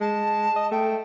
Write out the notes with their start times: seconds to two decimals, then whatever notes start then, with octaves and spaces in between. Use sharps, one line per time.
0.01 G#3 A5
0.56 D#5
0.71 A3 G5